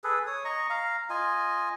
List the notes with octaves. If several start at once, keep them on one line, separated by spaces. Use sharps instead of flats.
G#4 A4 B4
C#5 D#6
D#5 A#5 C#6
F5 A#5
F4 D#5 G#5